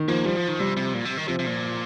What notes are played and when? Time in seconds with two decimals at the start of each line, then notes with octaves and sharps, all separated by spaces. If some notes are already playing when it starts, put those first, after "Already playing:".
Already playing: D#3
0.08 F3 A#3
0.25 F3 G3
0.37 F3
0.48 D#3
0.59 C3 G3
0.77 C3
0.94 A#2
1.05 C3
1.17 D#3
1.28 C3 F3
1.39 C3
1.46 A#2